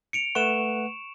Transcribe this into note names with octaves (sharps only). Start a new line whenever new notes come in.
C#7 D7 F7
A3 B4 F#5 C#6 E7